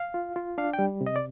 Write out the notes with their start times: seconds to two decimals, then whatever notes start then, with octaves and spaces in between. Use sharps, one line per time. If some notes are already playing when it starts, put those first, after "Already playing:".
Already playing: F5
0.14 F4
0.36 F4
0.58 D4 F5
0.73 G5
0.79 G3
1.01 C3
1.06 D#5
1.16 D5